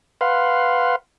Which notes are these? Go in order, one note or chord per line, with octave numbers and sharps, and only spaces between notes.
B4 F5 F#5 C6